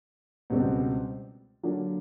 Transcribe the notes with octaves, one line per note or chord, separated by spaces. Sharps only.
C#2 B2 G3 C4
D3 F#3 A#3 D4